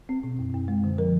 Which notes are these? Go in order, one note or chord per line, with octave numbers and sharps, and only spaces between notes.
C4
B2
F#2
F#2
G#3
D3
F3 A#4